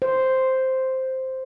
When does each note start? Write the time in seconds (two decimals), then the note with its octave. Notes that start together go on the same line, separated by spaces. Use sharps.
0.02 C5